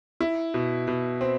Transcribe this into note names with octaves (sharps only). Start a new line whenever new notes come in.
E4
B2
B2
C4